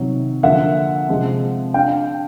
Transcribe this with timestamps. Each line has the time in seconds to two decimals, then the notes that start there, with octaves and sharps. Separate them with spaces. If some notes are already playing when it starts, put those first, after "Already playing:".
Already playing: C3 D#3 F#3
0.43 D3 F3 A#3 E5 F#5
1.09 C3 F3 G#3 C4
1.74 D4 F5 G5